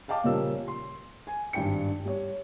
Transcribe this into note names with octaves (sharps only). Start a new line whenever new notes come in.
D#5 F5 G5 A5 D6
A#2 C#3 F3 G3 A#4 E6
C6
G#5
G#1 G2 D4 G5 C#7
G3 C#5